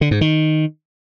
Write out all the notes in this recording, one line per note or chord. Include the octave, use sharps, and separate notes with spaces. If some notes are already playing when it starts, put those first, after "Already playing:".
D3
G#2
D#3